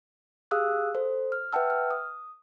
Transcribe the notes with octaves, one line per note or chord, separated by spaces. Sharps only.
G4 G#4 F5 D#6 E6 F#6
A4 C5
F6
B4 E5 F#5 G5 A5 E6
F6
D#6